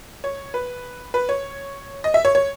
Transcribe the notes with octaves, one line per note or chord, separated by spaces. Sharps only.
C#5
B4
B4
C#5
D#5
E5
C#5
C#5